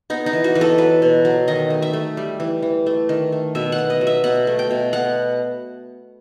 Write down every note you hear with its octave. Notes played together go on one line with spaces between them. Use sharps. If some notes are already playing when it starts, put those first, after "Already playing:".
B3 D#4
D#4
E3
F#4
E3 B4
A4
F#3 B4
B2
F#3
D#3 D#5
A3
E5
A3
G3
E3
E3
A3
D#3
A3
B2 E5
F#5
B3
D#5
F#3
E5
B2 F#5
A3
G5
B2
B3 F#5